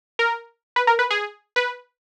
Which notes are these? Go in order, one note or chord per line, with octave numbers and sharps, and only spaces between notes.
A#4
B4
A#4
B4
G#4
B4